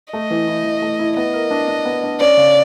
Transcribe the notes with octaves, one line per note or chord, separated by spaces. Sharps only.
A3 D#5
E3
E4
E3
A3
E4
B3 D#5
A#4
D4
D4
B3
D4
C#4 D5
C#3